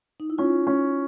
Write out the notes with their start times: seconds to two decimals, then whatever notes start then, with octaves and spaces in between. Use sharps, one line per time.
0.20 D#4
0.30 E4
0.38 C#4 F4
0.67 C#4